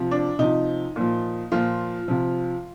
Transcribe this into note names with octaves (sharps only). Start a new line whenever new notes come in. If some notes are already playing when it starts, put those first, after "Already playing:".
Already playing: C3 F3
D4
C3 F3 D#4
A#2 F3
A#2 F3 F4
C3 F3